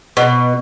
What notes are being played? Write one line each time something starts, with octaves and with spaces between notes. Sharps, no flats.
B2